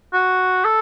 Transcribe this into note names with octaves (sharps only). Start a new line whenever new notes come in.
F#4
A4